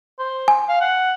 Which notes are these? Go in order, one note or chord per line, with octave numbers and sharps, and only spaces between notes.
C5
G#5
F5
F#5